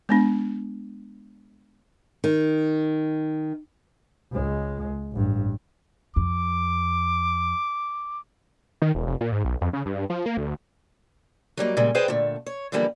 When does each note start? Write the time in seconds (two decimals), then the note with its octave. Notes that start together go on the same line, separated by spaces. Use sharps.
0.09 G#3 B3 D4
2.24 D#3
4.32 C#2 G#3
5.12 A1 G2
6.16 F2 D6
8.82 D#3
8.95 E1
9.07 F1
9.21 A#2
9.32 G#2
9.44 B1
9.61 F2
9.73 C#3
9.86 G2
10.10 F3
10.26 A#3
10.37 D2
11.57 F#3 G3 A#3 D#4
11.77 A#2 C#3 G3 G#3
11.95 G#4 B4 C5 D#5 F5 G5
12.08 A#2 D3 A3
12.46 C#5
12.72 D3 E3 F3 G3 A#3 B3